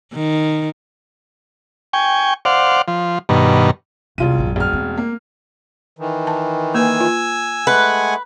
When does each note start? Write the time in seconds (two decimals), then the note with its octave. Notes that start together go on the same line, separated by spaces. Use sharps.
0.14 D#3
1.93 G5 G#5 C#6
2.45 C5 D5 F5 F#5
2.88 F3
3.29 G2 B2 D#3
4.18 E1 C2 F4 D#7
4.38 A#1 F#2
4.56 E1 F6
4.73 A3 C4
4.98 A#3
5.99 D#3 E3
6.27 A5
6.75 A#3 B4 G#5 E6
7.00 F4
7.67 G#3 A3 B4 F#5 G#5